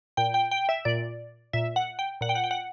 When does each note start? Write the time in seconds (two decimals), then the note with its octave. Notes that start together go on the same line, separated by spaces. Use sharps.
0.17 A#2 G5
0.34 G5
0.51 G5
0.69 E5
0.85 A#2 D5
1.53 A#2 E5
1.76 F#5
1.99 G5
2.21 A#2 F#5
2.29 G5
2.35 F#5
2.44 G5
2.51 F#5